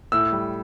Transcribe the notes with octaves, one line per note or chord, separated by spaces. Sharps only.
A2 E6
G3